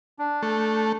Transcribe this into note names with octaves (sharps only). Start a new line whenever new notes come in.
D4
A3